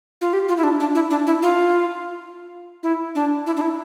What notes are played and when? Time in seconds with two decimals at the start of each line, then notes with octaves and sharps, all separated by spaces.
0.21 F4
0.33 G4
0.49 F4
0.57 E4
0.63 D4
0.80 D4
0.95 E4
1.10 D4
1.27 E4
1.42 F4
2.83 E4
3.15 D4
3.46 E4
3.57 D4
3.61 E4